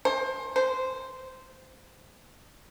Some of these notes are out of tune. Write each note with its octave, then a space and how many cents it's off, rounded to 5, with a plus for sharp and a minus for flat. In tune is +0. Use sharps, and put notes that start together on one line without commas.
C5 +25
C5 -10